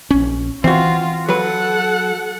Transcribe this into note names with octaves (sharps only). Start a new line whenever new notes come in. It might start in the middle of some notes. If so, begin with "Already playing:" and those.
A#1 C#4
E3 C4 F4 F#4
F#3 A4 B4 F#5